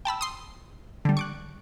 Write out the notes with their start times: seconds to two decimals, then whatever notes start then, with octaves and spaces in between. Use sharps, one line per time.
0.05 G5 A5 B5 E6
0.21 C6 D#6
1.05 D3 G3
1.17 C#6 D6 F#6